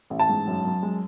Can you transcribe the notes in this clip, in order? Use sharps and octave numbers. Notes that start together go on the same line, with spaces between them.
A1
A5
G#2
F#2
F#2
G#3